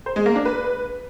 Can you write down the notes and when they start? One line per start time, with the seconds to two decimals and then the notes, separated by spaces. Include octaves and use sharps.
0.06 C5
0.16 G#3
0.26 A#3
0.36 D4
0.45 B4